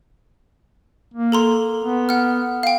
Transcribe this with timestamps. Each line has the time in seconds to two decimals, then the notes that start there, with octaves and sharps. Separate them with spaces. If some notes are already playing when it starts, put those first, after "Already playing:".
1.14 A#3
1.32 A4 A#5 C6
1.84 B3
2.09 F#5 F6
2.63 F5 G5